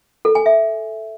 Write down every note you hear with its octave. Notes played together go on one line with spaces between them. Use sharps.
A4
G#5
E5